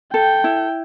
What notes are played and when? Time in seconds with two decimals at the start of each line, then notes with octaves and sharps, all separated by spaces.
0.13 A4 G5
0.44 E4